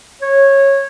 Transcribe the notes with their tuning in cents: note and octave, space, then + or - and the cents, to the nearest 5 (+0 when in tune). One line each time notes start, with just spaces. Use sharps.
C#5 -15